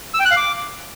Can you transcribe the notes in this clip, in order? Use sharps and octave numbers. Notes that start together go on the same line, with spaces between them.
E6
G5
F#6
F5
D6